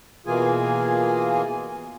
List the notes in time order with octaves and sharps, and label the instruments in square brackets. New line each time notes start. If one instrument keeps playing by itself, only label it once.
[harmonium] B2 E3 A#3 F4 G#4 G#5